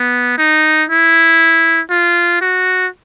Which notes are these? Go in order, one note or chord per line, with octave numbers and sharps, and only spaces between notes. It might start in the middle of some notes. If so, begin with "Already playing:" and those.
Already playing: B3
D#4
E4
F4
F#4